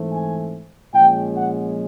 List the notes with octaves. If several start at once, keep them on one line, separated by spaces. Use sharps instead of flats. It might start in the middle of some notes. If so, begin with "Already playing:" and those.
Already playing: G#2 E3 A3 C4
G#5
A#2 F3 G#3 C#4 G5
F#5